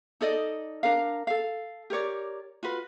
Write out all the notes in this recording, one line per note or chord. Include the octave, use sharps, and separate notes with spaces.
D#4 A4 D5 D#5
D4 A#4 F5
A4 F5
G4 A#4 C#5 D5
F4 F#4 B4